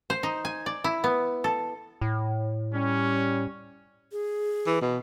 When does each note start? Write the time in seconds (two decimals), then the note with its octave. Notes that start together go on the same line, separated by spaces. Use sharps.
0.10 C5
0.23 D#4
0.45 G#5
0.66 D5
0.84 E4
1.04 B3
1.44 A4
2.01 A2
2.73 G3 C#4
4.12 G#4
4.66 E3
4.81 B2